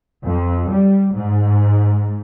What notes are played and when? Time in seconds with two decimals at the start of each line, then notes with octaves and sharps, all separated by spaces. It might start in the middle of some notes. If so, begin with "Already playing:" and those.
0.25 F2
0.70 G3
1.14 G#2